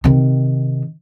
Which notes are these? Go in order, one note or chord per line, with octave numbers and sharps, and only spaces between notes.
C3 D#3